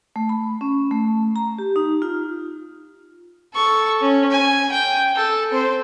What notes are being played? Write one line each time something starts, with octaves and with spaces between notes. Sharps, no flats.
A3
B5
C#4
A3
A#5
G4
D#4
F4
A4 C#6
C#4
G#5
G5
A4
C4 C5